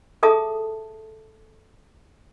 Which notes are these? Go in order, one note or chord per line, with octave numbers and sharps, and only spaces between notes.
G#4 A4 E5 A5 D#6